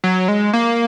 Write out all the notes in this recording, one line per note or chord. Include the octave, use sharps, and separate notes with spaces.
F#3
G#3
A#3